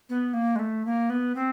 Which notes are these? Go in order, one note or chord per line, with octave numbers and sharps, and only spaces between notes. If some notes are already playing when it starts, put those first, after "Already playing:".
B3
A#3
G#3
A3
A#3
B3
C4